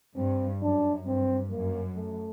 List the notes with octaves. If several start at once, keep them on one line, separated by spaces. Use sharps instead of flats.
G2 C4
F#2 D4
G2 C4
F#2 A#3
A3